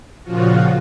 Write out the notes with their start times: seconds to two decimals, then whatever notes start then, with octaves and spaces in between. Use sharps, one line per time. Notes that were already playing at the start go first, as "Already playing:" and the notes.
0.23 A#2 C#3 F3 F4 F#4